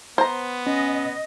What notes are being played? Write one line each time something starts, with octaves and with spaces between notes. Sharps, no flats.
B3 C5 A#5
C#4 D#5